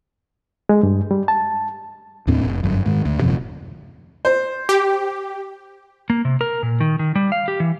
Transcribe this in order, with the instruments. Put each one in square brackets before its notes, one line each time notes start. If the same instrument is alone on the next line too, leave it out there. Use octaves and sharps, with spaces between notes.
[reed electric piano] G#3
G2
G3
A5
[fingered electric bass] D#2 A2 C4 D4
F1
G1 F#2
G#2 D#3
D2
D#1 F#2 C3 F3
[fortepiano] C5
[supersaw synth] G4
[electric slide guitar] A#3
C3
A#4
A#2
D#3
D#3
G3
F5
G4
E3